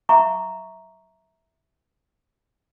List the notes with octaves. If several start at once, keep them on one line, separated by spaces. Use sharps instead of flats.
E5 F5 A#5 C#6 D6